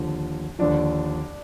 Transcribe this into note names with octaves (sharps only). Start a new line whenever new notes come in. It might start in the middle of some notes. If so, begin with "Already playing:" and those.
Already playing: D#2 D3 F3
D#2 D3 F3 D4